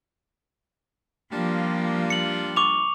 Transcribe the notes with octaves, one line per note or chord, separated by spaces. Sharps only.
F3 G3 A#3 D4 F4
C#7 F#7
C#6 D6 F7